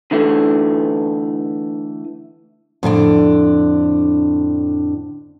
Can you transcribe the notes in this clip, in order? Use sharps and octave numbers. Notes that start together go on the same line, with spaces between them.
D3 E3 A3
F2 A2 D3 D4